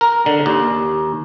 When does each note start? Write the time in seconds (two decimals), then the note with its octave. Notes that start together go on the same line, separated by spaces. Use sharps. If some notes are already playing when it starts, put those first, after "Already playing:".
0.01 A#4
0.26 D3
0.46 D#2